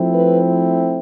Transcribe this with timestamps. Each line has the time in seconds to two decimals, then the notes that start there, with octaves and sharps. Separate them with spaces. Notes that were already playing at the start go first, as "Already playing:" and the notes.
Already playing: F3 A3 C4 E4
0.14 B4